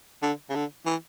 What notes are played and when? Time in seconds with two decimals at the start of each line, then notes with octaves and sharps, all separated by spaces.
0.23 D3
0.50 C#3
0.55 D3
0.86 E3